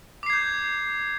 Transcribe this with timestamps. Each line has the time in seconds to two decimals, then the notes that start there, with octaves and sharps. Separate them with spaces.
0.23 D6
0.26 C7
0.30 G#6
0.33 G6